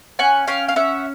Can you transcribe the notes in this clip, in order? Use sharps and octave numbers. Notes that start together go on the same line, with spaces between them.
C#4 F#5 G#5
C#4 F5 G5
F5
C#4 E5 F#5